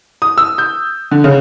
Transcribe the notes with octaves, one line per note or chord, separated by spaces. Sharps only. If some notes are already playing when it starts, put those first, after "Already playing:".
D#6
E6
G6
D3
C#3